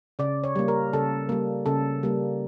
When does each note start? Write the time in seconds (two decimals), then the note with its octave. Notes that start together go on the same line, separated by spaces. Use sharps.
0.19 C#3 D5
0.44 C#5
0.56 G3 A#3
0.68 A#4
0.93 C#3 A4
1.29 G3 A#3
1.66 C#3 A4
2.03 G3 A#3